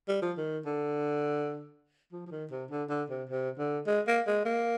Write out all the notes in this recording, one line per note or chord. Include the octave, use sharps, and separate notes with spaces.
G3
F3
D#3
D3
F3
F3
D#3
C3
D3
D3
C3
C3
D3
G#3
A#3
G#3
A#3